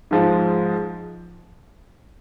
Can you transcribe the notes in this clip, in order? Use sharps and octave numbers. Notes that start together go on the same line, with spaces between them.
G#2 F3 G#3